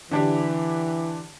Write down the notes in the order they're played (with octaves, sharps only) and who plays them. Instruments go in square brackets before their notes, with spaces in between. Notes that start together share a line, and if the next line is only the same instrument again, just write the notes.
[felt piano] D3 D4 G4 [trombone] E3